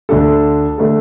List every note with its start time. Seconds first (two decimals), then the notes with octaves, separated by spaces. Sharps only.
0.09 D2 D3 A3 D4 A4
0.78 D3 A3 D4 A4